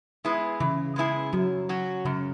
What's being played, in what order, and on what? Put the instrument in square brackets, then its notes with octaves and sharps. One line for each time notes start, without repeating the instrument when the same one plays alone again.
[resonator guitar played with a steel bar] G#3 B3 E4 G#4
[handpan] C#3 [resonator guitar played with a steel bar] E3
[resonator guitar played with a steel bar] G#3 B3 E4 G#4
[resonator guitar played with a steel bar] F#2 [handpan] F#3
[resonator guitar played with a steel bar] F#3 C#4 F#4
[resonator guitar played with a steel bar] F#2 [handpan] C#3